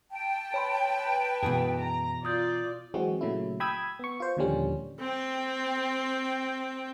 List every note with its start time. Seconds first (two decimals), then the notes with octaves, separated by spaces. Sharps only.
0.11 G5 A5
0.54 B4 C#5 B5 C6
1.43 F#2 B2 E3 G#4
1.80 A#5
2.25 F4 D5 D#6 G6
2.94 E3 F#3 G#3 C4 F#4
3.21 A#2 C#3 F#3 A3 E4
3.60 G5 B5 D#6 E6 G#6
3.99 B3 C#6
4.20 F4 C5
4.37 D#2 A#2 D3 F3 G3 C#4
5.00 C4 G5